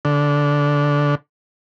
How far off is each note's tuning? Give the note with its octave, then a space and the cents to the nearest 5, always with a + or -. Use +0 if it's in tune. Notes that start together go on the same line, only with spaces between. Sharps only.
D3 -15